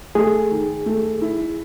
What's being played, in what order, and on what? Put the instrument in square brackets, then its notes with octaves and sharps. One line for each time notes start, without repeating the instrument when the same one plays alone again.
[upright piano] A3 [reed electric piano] G#4
[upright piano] D#3
A3
E4